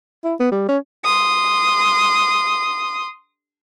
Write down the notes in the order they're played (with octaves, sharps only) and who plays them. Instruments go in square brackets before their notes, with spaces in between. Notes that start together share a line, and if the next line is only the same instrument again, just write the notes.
[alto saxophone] E4
B3
G3
C#4
[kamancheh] C6 D#6